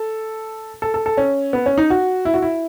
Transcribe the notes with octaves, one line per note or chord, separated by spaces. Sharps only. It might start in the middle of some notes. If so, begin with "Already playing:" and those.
Already playing: A4
A4
A4
A4
C#4
B3
C#4
D#4
F#4
E4
F#4
E4